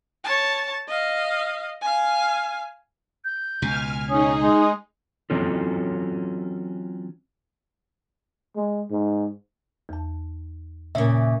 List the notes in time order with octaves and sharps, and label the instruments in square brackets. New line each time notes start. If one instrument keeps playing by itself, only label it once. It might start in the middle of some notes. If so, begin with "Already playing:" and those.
[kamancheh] C#5 A5
D#5 F5
F5 G#5
[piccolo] G6
[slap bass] C#2 B2 [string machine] G#5 F6
[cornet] C#4 [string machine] D#4 G#4 [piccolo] D#6
[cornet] G#3
[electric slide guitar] E3 F#3 C4 C#4 F4 A4
[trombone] G#3
G#2
[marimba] E2 A5
[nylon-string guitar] A#2 C#3 [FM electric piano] E5